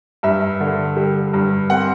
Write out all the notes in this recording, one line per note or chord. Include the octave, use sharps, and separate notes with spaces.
G2 E5
D3
G3
G2
C4 F#5